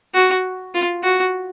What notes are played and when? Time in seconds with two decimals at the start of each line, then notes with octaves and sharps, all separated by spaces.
0.14 F#4
0.75 F4
1.04 F#4